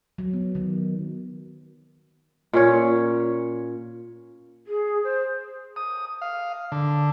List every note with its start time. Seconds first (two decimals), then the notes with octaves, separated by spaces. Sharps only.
0.18 F#3
0.33 B3
0.55 D#3
2.53 A#2 C#4 C#5
4.67 G#4
5.04 C5
5.76 D#6
6.22 F5
6.72 D3